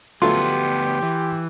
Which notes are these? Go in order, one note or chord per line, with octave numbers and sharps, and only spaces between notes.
D2 F#3 A3 B3 F4 G4 C6
E3